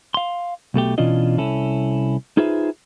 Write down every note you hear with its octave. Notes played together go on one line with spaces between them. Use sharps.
F5 C6
B1 B2 A3 G4
B2 E3 C#4 D4 F4 D#5
C2 C#4 E4 A4
D#4 F4 G#4 B4 C5 E5